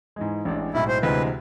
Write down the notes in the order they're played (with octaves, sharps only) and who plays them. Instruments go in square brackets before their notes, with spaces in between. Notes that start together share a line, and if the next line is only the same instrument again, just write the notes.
[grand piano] G#2 E3 G#3
A1 A2 G#3 D4
[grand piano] B1 A2 G#3 [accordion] E4
[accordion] C5
[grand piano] D2 C3 E3 G#3 C4 [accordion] B4